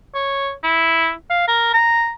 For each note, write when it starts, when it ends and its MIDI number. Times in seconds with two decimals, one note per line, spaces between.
0.15 0.52 73
0.63 1.12 64
1.30 1.47 77
1.48 1.73 70
1.74 2.12 82